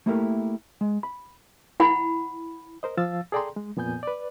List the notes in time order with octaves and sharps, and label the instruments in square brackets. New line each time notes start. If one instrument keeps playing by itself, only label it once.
[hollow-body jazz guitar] A3 A#3 E4 G4 A4 A#4
G#3
B5
[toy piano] E4 F#5 B5
[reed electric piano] A#4 C5 D#5
F3 F5 E6 A6
G#4 A4 D5 G5 A#5 C6
G#3
F2 A#2 B3 G#5 G6
B4 D5